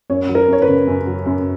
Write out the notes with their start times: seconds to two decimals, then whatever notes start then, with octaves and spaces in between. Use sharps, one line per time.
0.10 F#2 C#5
0.29 F#3
0.35 A#4
0.48 F#2 C#5
0.62 B4
0.68 C#3
0.87 F#2
1.06 F#3
1.26 F#2